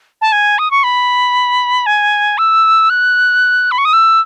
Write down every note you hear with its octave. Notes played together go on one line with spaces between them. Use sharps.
A5
G#5
D#6
C#6
B5
G#5
E6
F#6
B5
C#6
D#6
E6